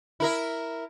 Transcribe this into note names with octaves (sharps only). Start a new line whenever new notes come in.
E4 A#4 E5